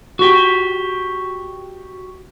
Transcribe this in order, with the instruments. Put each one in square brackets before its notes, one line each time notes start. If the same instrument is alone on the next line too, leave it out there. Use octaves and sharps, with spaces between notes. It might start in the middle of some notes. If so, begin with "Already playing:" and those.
[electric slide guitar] F#4 G4